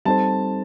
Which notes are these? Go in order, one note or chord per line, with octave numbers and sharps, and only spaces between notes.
G3 C4 D#4 A4 C5 A5